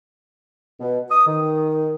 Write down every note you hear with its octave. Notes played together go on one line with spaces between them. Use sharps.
B2
D#6
D#3